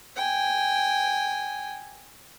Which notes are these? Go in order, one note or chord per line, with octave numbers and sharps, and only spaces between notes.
G5 G#5